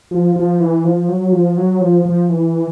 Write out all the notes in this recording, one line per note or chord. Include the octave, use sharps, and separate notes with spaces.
F3
F3
E3
F3
F#3
F3
F#3
F3
F3
E3